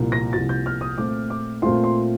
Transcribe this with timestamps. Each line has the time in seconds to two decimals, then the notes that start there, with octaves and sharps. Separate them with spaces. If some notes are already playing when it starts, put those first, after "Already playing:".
Already playing: C2 A#2 F3
0.12 A#6
0.33 C2 A#2 F3 A6
0.49 G6
0.66 F6
0.81 D#6
0.98 A#2 A3 C4 F4 D6
1.30 D6
1.62 A#2 A3 C4 F4 C6
1.84 C6